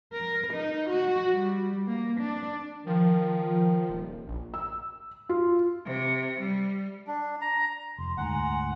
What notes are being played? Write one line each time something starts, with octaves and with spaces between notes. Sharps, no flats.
A#4
D#4
F#4
G3
A#3
D4
D#3 F3
D#1
A#1
E6
F4
C3
G3
D4
A#5
F1 C6
D2 G#2 F#5 G#5 A#5 C6